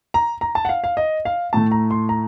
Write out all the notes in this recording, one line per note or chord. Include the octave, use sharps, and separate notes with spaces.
A#5
A#5
A5
F#5
F5
F5
D#5
F5
A2 A3 A5
A#5
C6
A#5